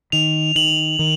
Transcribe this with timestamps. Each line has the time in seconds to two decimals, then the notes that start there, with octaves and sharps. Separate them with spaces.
0.12 D#3 F7
0.56 D#3 F#7
0.99 D#3